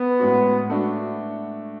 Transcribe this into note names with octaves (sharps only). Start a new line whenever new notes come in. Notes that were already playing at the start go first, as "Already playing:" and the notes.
Already playing: B3
A2 G#3 C#4 F#4
A3 D4 F#4